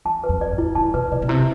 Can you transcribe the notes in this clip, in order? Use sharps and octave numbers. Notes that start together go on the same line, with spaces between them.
E2 A5
B4
F2
D5
A2
E4
G#2 A5
B2 B4
B2 D5
B2
C3 E4